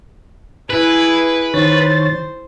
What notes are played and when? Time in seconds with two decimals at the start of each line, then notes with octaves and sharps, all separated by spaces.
0.70 E4 G#4 B4
1.54 D#3 C5 C#5 A6